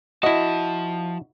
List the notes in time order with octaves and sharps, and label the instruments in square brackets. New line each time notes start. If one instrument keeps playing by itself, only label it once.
[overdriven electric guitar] F3 A5 [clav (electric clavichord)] E4 F#4 [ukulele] D#5